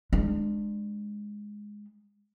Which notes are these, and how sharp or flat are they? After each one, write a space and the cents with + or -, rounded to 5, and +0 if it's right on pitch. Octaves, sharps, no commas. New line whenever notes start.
G#3 +0 D4 +25